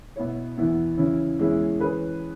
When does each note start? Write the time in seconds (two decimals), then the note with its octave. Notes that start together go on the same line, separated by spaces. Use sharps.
0.16 B2 B3 E4 C#5
0.57 E2 E3 B3 E4
0.97 C#3 E3 C#4 E4
1.39 E2 E3 G#3 C#4 E4
1.80 E3 C#4 G#4 B4